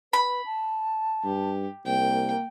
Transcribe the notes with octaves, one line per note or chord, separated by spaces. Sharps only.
B4 B5
A5
G2 G4
C2 A#3 G5